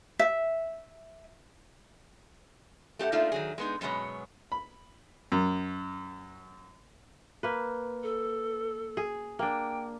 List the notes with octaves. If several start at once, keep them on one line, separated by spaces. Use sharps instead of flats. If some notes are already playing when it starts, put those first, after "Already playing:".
E5
A3 G4 D#5 F#5
A3 A#3 D#4 F4 D5 E5
D#3 F#3 G#4
G#3 B3 D#4
F#2 B2 F#3 G#3 B3 C#5
B5
F#2
A#3 B4
A4
G#4
A#3 D4 G5